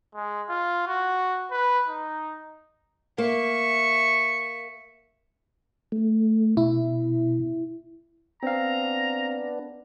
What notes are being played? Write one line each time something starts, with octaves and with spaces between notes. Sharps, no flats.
G#3
F4
F#4
B4
D#4
A#3 E5 C#6
A3
B2 E4
B3 C4 D4 F5 A#5